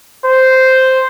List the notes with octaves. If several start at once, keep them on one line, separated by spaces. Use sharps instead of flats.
C5